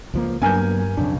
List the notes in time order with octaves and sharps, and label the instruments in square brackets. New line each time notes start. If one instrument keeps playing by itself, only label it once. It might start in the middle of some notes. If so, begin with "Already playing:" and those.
[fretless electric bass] C#2 F3 A#3
[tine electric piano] G2 A#4 G6 [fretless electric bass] F#3 A#3 B3 [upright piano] G#5
[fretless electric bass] B1 F2 C#3 [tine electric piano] D4